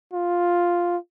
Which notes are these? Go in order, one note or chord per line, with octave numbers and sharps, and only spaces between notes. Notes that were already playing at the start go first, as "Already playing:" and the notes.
F4